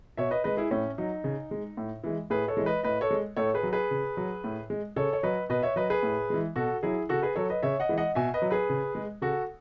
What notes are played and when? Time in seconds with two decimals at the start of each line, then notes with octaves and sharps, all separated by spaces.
0.17 B2 C#5 E5
0.31 B4 D#5
0.44 G#3 B4 D#5
0.57 E4 G#4
0.71 A2 C#4
0.98 F#3 D#4
1.24 C#3
1.51 G#3
1.77 A2
2.04 E3 G#3
2.30 A2 G#4 B4
2.48 A4 C#5
2.57 E3 G#3
2.66 B4 D#5
2.83 A2 B4 D#5
3.01 A4 C#5
3.11 G#3
3.37 A2 A4 C#5
3.54 G#4 B4
3.63 F#3
3.73 G#4 B4
3.91 C#3
4.17 F#3
4.44 A2
4.70 G#3
4.96 C#3 A4 C#5
5.13 C#5
5.23 F#3 B4 D#5
5.49 B2 B4 D#5
5.63 C#5 E5
5.76 F#3 B4 D#5
5.90 G#4 B4
6.03 A2
6.30 E3 G#3
6.56 B2 F#4 A4
6.83 F#3 E4 G#4
7.09 C#3 F#4 A4
7.22 G#4 B4
7.35 F#3 A4 C#5
7.50 B4 D#5
7.63 C#3 C#5 E5
7.80 D#5 F#5
7.89 E3 G#3
7.98 D#5 F#5
8.15 B2 E5 G#5
8.34 B4 D#5
8.42 F#3
8.51 G#4 B4
8.70 C#3
8.95 G#3
9.22 C#3 F#4 A4